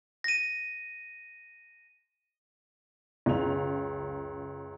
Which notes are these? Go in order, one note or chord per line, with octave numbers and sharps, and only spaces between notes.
A#6 D#7
C#2 F#2 F5 F7